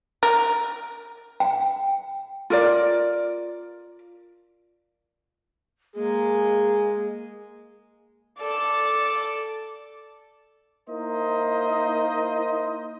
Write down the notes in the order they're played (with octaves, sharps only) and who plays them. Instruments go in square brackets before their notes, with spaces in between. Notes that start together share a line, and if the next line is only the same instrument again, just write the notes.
[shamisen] A#4
[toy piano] G5
[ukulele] F4 A#4 D5
[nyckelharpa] G#3 [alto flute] A#3 [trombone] G#4
[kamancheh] A4 D5
[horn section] A#3 D#4 E4 A#4 C5 D#5